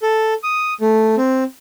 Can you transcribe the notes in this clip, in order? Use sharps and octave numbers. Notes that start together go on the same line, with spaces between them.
A4
D#6
A3
C4